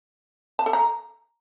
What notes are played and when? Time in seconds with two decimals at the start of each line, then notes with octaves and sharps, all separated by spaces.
0.59 A5
0.66 A4
0.73 A#5